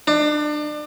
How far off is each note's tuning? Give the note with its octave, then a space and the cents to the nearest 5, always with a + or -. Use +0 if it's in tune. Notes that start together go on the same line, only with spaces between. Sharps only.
D4 +30